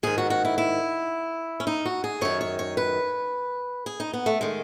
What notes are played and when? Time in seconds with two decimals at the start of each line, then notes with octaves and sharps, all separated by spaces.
0.03 G#2 D#3 G#4
0.18 F#4
0.30 F#4
0.45 E4
0.58 E4
1.60 C#4
1.67 D#4
1.86 F#4
2.04 G#4
2.21 F#2 D#3 C#5
2.41 C#5
2.59 C#5
2.77 B4
3.86 G#4
4.00 D#4
4.13 B3
4.26 A3
4.41 D#3 G#3